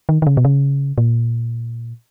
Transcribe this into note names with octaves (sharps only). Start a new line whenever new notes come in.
D#3
D#3
C#3
B2
C#3
A#2